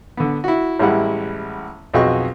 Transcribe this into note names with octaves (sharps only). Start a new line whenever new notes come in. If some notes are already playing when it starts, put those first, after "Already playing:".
D3 B3
E4 F#4
A1 G3 G#3 E4 F#5
B1 F2 F#4 G#4 D#5 C#6